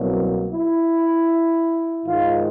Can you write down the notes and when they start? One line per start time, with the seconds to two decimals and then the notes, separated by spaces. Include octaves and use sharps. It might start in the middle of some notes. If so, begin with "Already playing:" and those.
Already playing: C2 B2 F#3 A#3
0.52 E4
2.06 G#2 D#3 G#3 F4